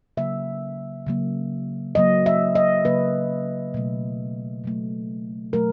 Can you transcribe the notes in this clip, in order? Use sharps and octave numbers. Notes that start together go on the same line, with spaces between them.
C#3 F#3 A#3 E5
C#3 F#3 A#3
C#3 F#3 A#3 D#5
E5
D#5
C#3 F#3 A#3 B4
B2 F#3 A3
B2 F#3 A3
B2 F#3 A3 A#4